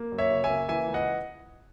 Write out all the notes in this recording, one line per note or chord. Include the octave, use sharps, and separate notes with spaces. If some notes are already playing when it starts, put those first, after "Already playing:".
Already playing: A#3
F#2
C#5 E5
C#3
E5 G#5
A#3
E3 E5 G#5
C#2
D#5 F#5